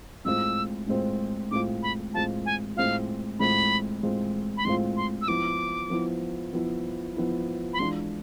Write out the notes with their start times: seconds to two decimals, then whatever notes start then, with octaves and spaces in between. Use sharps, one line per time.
0.25 A2 G#3 C4 F4 E6
0.88 A2 G#3 C4 F4
1.51 A2 G#3 C4 F4 D6
1.83 B5
2.14 A2 G#3 C4 F4 A5
2.46 G#5
2.76 A2 G#3 C4 F4 F5
3.39 A2 G#3 C4 F4 B5
4.03 A2 G#3 C4 F4
4.57 B5
4.65 A2 G#3 C4 F4 C6
4.97 C6
5.22 E6
5.28 F3 B3 E4 D6
5.90 F3 B3 E4
6.53 F3 B3 E4
7.17 F3 B3 E4
7.73 B5
7.79 E3 G#3 D4 F4 C6